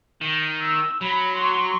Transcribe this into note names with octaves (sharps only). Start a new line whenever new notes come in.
D#3
E6
F#3 B5
C6 C#6